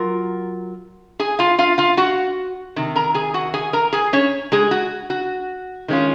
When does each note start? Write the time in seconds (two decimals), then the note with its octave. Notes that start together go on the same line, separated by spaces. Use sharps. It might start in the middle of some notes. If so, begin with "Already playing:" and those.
Already playing: F#3 F4 A#4
1.20 G#4 G#5
1.39 F4 F5
1.59 F4 F5
1.78 F4 F5
1.97 F#4 F#5
2.76 C3 D#3
2.96 A#4 A#5
3.14 G#4 G#5
3.34 F#4 F#5
3.54 G#4 G#5
3.73 A#4 A#5
3.93 G#4 G#5
4.13 C#4 C#5
4.52 G#3 G#4
4.71 F#4
5.10 F#4
5.88 D#3 G#3 C#4 F4